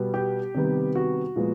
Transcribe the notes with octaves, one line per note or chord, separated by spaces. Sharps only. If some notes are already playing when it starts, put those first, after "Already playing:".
Already playing: B2 G3 B3
G4
C3 D#3 G3 B3
F#4
A#2 F3 G#3 B3